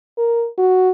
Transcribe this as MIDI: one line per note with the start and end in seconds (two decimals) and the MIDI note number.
0.18 0.47 70
0.58 0.91 66